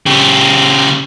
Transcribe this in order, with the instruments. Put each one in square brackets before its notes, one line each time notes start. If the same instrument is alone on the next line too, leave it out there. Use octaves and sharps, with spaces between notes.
[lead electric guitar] C#3 G4